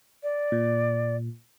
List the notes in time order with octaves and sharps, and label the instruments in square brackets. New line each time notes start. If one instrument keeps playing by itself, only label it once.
[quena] D5
[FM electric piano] A#2